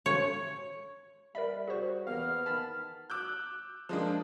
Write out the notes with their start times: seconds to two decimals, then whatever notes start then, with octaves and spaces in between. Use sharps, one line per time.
0.06 C#5
1.35 G3 A#4 D5 E5 B5
1.67 F#4 G#4 C5 C#6
2.07 E2 A#3 B3 F5 F6
2.46 D#3 A5 B5
3.10 D6 E6 F#6 G6
3.89 F3 G#3 A#3 D4